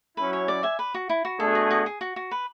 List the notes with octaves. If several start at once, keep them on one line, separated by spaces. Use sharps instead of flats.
F#3 C#4 E4 B4
C#5
D5
E5 G#5
B4
F#4
E4
F#4
B2 A3 D4 G#4 A4
F#4
F#4
G#4
F#4
F#4
B4